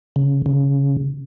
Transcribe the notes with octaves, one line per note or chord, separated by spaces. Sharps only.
C#3
C#3